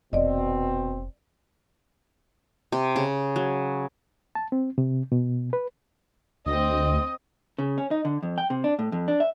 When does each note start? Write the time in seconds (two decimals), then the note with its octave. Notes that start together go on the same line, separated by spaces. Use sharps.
0.13 F1 B2 C4 D5 D#5
2.72 C3
2.96 C#3
3.36 F#3
4.35 A5
4.52 C4
4.78 C3
5.12 B2
5.53 B4
6.46 D2 C4 D#5 D#6
7.58 C#3
7.78 C#4
7.91 D#4
8.05 D3
8.23 F2
8.38 G5
8.50 C3
8.64 D4
8.79 A2
8.92 F2
9.08 D4
9.20 E5